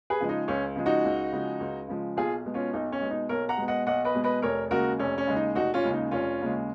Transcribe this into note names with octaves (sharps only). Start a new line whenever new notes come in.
G#4 B4
C#3 F3 G#3
D#4
C#2 C#4
C#3 F3 G#3
D#4 F#4
C#2
C#3 F3 G#3
C#2
C#3 F3 G#3
B1 F4 G#4
B2 G#3
C#4 F4
B1 D#4
C#4
B2 G#3
D#4
B1 A#4 C#5
F#5 A#5
B2 G#3
D#5 F#5
B1 D#5 F#5
B4 D#5
B2 G#3
B4 D#5
F1 A#4 C#5
D#2 C#3 G#3 F#4 A#4
F1 C#4
C#4
D#2 C#3 G#3
D#4
F1 D#4 F#4
C#4 F4
D#2 C#3 G#3
D#4
F1 C#4 F4
D#2 C#3 G#3